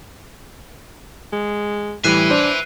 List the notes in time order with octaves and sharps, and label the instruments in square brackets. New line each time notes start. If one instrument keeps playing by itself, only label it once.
[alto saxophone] G#3
[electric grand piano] A2 E3 G3 [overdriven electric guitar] B4 E5 [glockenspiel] F#6 C7 D#7
[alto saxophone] D4 [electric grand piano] C5